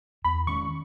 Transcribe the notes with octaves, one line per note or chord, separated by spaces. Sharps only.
E2 B5
D#3 G#3 C#4 C#6